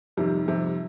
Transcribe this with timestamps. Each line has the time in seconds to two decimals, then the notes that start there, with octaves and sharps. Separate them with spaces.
0.17 F2 C3 D#3 G3
0.46 F2 C3 D#3 G3